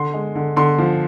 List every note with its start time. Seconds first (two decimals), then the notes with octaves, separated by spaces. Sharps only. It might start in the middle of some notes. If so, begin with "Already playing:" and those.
Already playing: D3 C6
0.14 G#3
0.35 D3
0.56 D3 C6
0.78 F3